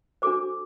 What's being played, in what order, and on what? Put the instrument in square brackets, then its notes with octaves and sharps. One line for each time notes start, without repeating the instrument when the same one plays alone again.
[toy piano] D4 F#4 A4 C5 D6